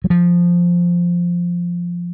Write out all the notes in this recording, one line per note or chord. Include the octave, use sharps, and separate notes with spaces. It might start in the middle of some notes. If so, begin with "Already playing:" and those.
F#3
F3